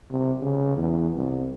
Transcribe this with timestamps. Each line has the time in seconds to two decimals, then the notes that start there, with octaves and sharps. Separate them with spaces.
0.11 C3
0.42 C#3
0.77 E2
1.15 C2